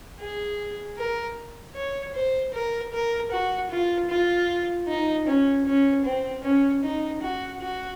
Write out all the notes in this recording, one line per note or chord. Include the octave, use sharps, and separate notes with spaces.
G#4
A#4
C#5
C5
A#4
A#4
F#4
F4
F4
D#4
C#4
C#4
C4
C#4
D#4
F#4
F#4